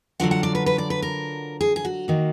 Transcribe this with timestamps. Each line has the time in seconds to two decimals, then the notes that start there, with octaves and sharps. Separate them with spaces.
0.20 D3 F#3 D4 F4 F#5
0.31 F#5
0.43 D5
0.55 B4
0.66 B4
0.78 D5
0.90 B4
1.02 A#4
1.61 G#4
1.76 G#4
1.85 F#4
2.08 D#3 A#3